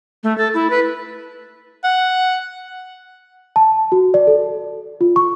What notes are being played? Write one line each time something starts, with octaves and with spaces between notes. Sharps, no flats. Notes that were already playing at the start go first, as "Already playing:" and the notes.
A3
A4
E4
B4
F#5
A5
F#4
D5
A4
F4
C#6